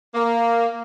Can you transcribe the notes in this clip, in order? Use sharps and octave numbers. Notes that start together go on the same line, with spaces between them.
A#3